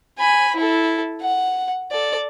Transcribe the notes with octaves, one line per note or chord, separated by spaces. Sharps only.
G#5 B5
E4 A4
F#5
A4 D5